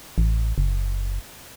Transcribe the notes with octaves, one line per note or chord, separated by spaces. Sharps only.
A1
F#1